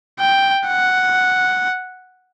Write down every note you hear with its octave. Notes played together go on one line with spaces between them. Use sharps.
G5
F#5